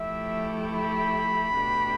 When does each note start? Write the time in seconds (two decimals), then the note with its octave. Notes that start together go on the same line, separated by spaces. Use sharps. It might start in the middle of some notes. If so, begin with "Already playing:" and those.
Already playing: F3 A3 E4 G4 E5
0.73 B5
1.57 B2 A3 D4 G4